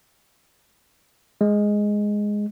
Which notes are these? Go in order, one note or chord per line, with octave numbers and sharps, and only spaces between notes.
G#3